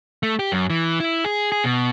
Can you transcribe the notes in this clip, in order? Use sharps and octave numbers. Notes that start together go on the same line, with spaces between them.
A3
G4
F#2
E3
E4
G#4
G#4
B2